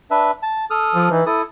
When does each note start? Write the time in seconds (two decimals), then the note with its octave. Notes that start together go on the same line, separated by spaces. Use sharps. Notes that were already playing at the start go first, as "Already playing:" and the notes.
0.11 D4 B4 E5
0.42 A5
0.70 A4 D#6 F6
0.95 F3
1.11 E3 D#4
1.26 E4 A4 D#6